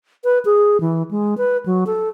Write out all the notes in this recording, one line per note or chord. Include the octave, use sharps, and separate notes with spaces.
B4
G#4
E3
G#3
B4
F#3
A4